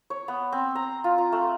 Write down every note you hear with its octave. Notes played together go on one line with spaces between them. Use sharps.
C#5
B3
C4
A#5
F4
A#5
A3